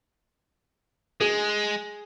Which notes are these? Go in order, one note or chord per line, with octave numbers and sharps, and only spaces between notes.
G#3 G#4